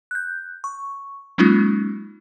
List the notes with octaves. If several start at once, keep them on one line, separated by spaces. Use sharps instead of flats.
F#6 G6
C#6
F#3 G#3 A#3 C#4 D#4 F4